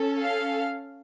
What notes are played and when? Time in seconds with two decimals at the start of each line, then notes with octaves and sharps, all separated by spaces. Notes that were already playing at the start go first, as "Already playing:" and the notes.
Already playing: C#4 A4
0.20 F5